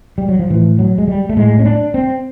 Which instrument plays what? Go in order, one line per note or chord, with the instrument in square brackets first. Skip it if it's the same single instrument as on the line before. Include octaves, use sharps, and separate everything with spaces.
[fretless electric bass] G3
F#3
F3
A2 E3
F#3
G#3
G3
A3
A2 G#3
C#4
D4
C4